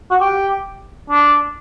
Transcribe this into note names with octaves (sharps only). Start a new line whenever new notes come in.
F#4
G4
D4